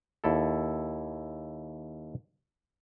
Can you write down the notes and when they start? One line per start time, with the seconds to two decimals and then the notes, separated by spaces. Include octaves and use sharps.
0.24 D#2 E4 A4